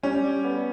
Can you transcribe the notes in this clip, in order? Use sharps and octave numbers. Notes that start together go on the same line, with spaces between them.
G3 C#4
G3
B3